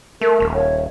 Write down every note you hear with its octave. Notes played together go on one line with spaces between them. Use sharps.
A3 A#4
D#1
C#5